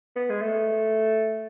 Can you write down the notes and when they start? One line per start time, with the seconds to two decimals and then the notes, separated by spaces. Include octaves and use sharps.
0.16 B3
0.30 G#3
0.41 A3